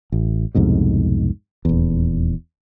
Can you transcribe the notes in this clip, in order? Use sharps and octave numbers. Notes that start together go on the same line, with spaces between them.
A1
C2 F2 G#2 B2
D#1 E2